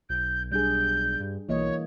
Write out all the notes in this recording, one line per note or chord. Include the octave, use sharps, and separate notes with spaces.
B1 G6
G3 D4 G#4 G6
G2
B1 E3 A#3 C#5 D#5